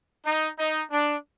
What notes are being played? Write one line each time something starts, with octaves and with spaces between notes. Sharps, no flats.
D#4
D#4
D4